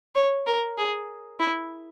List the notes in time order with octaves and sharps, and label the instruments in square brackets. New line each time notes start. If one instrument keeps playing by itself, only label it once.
[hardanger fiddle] C#5
A#4
G#4
E4